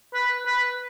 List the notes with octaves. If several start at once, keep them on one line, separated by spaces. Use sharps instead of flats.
B4
B4